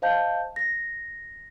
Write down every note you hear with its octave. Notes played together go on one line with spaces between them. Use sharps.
C5 D#5 F5 A5 G6
A#6